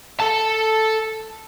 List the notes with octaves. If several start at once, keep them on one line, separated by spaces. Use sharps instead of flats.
A4 A5